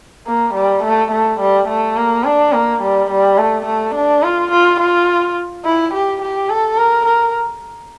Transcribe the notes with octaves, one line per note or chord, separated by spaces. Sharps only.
A#3
G3
A3
A3
G3
A3
A#3
D4
A#3
G3
G3
A3
A3
D4
F4
F4
F4
E4
G4
G4
A4
A#4
A#4